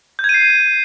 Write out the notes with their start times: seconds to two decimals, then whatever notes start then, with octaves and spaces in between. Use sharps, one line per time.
0.19 G6
0.24 G#6
0.29 D#7
0.34 C7